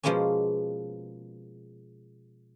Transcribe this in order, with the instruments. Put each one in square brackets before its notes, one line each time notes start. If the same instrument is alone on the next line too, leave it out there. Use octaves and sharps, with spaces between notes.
[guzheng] B2 F3 G#3 A#3 B3 C#4